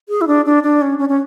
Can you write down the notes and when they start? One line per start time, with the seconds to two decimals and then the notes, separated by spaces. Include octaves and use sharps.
0.09 G#4
0.21 E4
0.27 D4
0.45 D4
0.63 D4
0.82 C#4
0.98 C#4
1.09 C#4